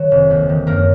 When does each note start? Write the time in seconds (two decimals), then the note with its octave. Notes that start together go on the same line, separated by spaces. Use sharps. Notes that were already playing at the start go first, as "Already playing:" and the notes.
Already playing: D#3 F#3
0.11 F1
0.30 D#2
0.49 D#3
0.67 F#2 A#3 A#4